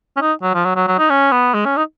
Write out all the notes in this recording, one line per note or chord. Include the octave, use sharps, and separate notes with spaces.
C#4
D#4
F#3
F3
F#3
F#3
F#3
D#4
C#4
B3
G#3
C#4
D#4